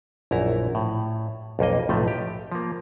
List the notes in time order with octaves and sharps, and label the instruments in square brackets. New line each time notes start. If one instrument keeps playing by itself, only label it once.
[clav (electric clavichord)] A#1 F#2 E4 A#5
A2
B1 F2 A#3 D#5
B1 A2 C3 F3 A3
G4
F3 A#3